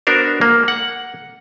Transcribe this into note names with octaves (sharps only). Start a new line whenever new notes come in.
B3 D4 F#4 A#4 C5
A#3
F#5